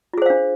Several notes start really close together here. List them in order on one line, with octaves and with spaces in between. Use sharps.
F4 G#4 C5 F5 D4